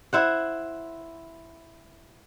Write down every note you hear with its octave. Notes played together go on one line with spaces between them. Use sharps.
E4 C5 F#5